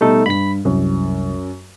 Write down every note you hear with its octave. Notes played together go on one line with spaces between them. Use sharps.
B2 G3 A3 D#4 A4
G2 B5 B6
C2 F#2